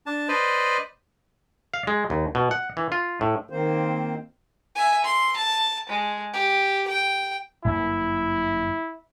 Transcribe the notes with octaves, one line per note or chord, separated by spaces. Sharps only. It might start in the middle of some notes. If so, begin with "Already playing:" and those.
D4 A5
B4 C5 D5 D#5
F5
G#3
D#2
B2
F#5
E3
F4
A2
D#3 A#3 C4 C5
E5 G#5
C6
A5
G#3
G4
G5
G1 F#2 A#3 E4